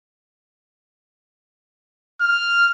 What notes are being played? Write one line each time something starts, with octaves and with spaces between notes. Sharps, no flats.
F6